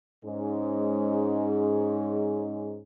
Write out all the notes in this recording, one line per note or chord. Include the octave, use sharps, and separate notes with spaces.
G#2 G#3 C#4